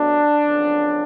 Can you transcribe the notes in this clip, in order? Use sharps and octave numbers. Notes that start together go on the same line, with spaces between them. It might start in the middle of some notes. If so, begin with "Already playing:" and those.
Already playing: B2 F#3 A3 D4
F2 C#3 F#3 B3